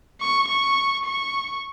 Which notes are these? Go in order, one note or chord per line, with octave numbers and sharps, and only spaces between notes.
C#6
C#6
C#6